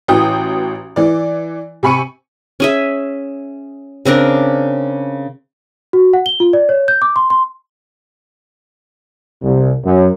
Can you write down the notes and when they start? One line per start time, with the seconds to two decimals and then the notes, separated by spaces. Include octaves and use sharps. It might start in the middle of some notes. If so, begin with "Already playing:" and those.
0.08 A1 E3 F#4 G5 D#6
0.96 E3 D5
1.83 C3 G#5 B5 C#6 C#7 D#7
2.60 C#4 G#4 E5
4.05 C#3 C4 D4 A#4
5.93 F#4
6.13 F#5
6.26 G7
6.40 F4
6.53 D5
6.69 C#5
6.88 G6
7.02 D6
7.16 C6
7.30 C6
9.42 C2
9.84 F#2